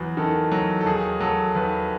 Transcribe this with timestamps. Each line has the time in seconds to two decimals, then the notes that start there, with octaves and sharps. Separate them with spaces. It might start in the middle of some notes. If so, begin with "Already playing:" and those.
Already playing: E2 F#3 B4
0.17 D#3 A4
0.52 F#3
0.81 A4
0.86 D#2 G#4
1.20 F#3 A4
1.55 D#2 B4